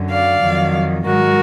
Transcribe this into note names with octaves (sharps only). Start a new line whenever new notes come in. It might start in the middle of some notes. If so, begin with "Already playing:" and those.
Already playing: F#2 D3 F#3
D5 F5
F2 D#3 F#3
G#2 D#3 F#3 F#4 A#4